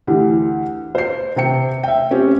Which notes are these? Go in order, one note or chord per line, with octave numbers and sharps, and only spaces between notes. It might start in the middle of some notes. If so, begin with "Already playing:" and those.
D2 E3 G4
C5 C7
C3 C4 G5 C#7
E5 G5
C4 C#4 G4 C#5